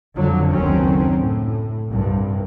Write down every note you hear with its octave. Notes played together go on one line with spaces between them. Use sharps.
F2 D3 F#3
F#1 D2 D#3 F#3 C4 C#4
A2
C2 G2